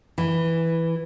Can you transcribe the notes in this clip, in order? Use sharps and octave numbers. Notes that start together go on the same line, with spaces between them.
E3